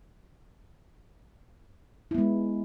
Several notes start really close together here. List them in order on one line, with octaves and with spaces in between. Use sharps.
E4 B3 G#3